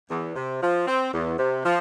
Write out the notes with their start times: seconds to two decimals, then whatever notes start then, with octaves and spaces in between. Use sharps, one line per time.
0.11 E2
0.36 C3
0.62 F3
0.87 C4
1.14 E2
1.39 C3
1.65 F3